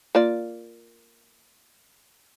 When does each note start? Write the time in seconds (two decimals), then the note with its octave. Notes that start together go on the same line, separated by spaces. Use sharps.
0.15 A#3 F4 D5